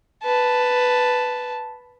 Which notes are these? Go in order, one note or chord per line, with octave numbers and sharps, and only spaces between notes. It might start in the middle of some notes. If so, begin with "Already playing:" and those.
B4 A5